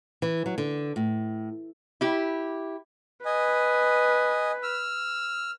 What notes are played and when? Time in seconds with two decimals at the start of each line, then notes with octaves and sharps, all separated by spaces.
0.22 E3
0.46 F#3
0.58 D3
0.96 A2
2.01 E4 G4
3.25 B4 D#5 G#5
4.63 E6 F6